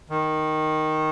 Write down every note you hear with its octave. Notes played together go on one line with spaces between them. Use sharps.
D#3